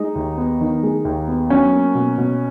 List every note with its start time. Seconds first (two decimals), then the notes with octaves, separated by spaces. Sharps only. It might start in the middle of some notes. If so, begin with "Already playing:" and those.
Already playing: G#3 D#4
0.15 D#2
0.37 B3
0.61 D#3
0.83 G#3
1.05 D#2
1.28 B3
1.50 F#3 C#4
1.73 A#3
1.95 B2
2.18 B2